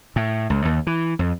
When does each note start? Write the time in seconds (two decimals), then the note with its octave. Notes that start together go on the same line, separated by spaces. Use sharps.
0.16 A2
0.50 C#2
0.65 D#2
0.87 E3
1.19 F2